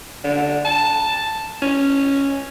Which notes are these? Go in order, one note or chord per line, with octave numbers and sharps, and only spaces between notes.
D3
A5
C#4